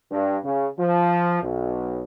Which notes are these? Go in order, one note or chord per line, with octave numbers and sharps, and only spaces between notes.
G2
C#3
F3
B1